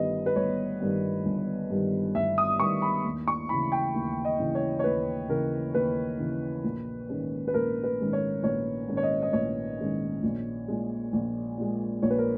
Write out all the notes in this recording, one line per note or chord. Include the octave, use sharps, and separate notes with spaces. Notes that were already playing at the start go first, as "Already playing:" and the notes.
Already playing: G1 G2 D#3 G3 B3 D#5
B4
G1 C#5
G2 D#3 G3 B3
G1
G2 D#3 G3 B3
G1 E5
D#6
G2 D#3 G3 B3 C#6
B5
D#2
C#6
C#3 E3 B5
G5
D#2
D#5
C#3 E3
C#5
C#5
D#2 B4
C#3 E3 A#4
D#2 B4
C#3 E3
A#1
G#2 D#3 G#3 C#4
B4
A#1 A#4
B4
G#2 D#3 G#3 C#4
C#5
A#1 C#5
G#2 D#3 G#3 C#4
C#5
D#5
D#5
A#1 C#5
G#2 D#3 G#3 C#4
A#1
A#2 G#3
A#1
A#2 G#3
A#1 C#5
B4
A#4